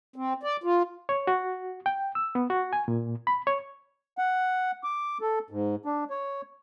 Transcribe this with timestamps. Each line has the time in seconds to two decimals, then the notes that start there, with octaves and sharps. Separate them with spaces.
0.16 C4
0.43 D5
0.64 F4
1.09 C#5
1.27 F#4
1.86 G5
2.15 E6
2.35 B3
2.50 F#4
2.73 G#5
2.88 A#2
3.27 B5
3.47 C#5
4.18 F#5
4.84 D6
5.21 A4
5.50 G#2
5.85 D4
6.10 C#5